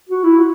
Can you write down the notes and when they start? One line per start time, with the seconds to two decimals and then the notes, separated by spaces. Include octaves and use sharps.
0.09 F#4
0.24 E4
0.38 F#4